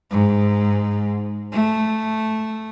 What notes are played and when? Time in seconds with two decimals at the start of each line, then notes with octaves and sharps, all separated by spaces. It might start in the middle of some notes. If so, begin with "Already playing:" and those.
0.11 G#2
1.52 A3